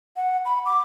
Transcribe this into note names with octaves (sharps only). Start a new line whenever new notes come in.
F#5
B5
D6